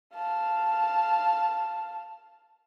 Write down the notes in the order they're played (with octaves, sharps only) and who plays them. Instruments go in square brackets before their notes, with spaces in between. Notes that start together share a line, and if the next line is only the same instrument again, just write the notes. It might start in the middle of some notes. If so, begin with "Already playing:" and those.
[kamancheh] F5 A5